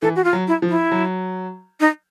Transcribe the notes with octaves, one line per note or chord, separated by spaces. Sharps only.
E3 A4
F#4
F4
F#3
E4
F3
E4
F#3
D#4